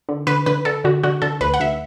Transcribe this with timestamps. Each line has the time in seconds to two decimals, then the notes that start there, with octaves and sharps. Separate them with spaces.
0.09 D3
0.27 D3 B4
0.46 D3 B4
0.65 D3 A4
0.84 D3 F#4
1.03 D3 F#4
1.22 D3 A4
1.41 D2 B4
1.54 F#5
1.60 D2 E5